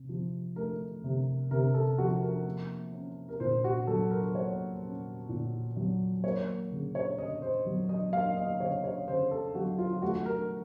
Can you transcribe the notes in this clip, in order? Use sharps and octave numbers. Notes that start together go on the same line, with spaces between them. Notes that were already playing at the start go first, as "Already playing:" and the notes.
Already playing: C3
F3
A3 A#4
C3
C3 A#4
A4
F3 F#4
A#4
A#3
C#4
A#4
A#2 C5
F#4
F#3 A4
A#4
A#3 C#5
C#4
A#2
F#3
A#3 C#5
C#3
C#5
C#3 D#5
C5
F#3
D#5
A#3 F5
D#5
C#3 C#5
C#5
C#3 C5
A4
F#3 F#4
F4
A3 F#4
A#4